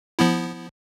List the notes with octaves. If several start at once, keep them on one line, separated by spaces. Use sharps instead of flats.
F3 B3 E4